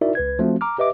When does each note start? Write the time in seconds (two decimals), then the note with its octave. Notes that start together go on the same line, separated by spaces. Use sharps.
0.01 D#4 E4 F#4 A#4 D5 E5
0.15 C#2 B4 G#6
0.39 F3 A3 C4 F#4
0.61 A#5 D6 F6
0.78 G4 B4 D#5 E5 D6